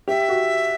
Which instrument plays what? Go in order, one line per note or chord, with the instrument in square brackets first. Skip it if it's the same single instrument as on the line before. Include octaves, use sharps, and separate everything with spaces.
[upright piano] G4 [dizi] E5
[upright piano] F#4